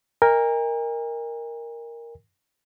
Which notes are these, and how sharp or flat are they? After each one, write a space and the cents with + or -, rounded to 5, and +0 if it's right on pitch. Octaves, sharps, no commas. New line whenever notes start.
A#4 +0 D#5 +0 G#5 -45